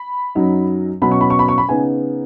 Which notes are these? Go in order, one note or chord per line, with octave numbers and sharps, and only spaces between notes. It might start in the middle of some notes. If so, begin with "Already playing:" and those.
Already playing: B5
F#2 F#3 D#4
B2 F#3 C#4 B5
C#6
B5
C#6
B5
C#6
B5
C#3 B3 D#4 G#5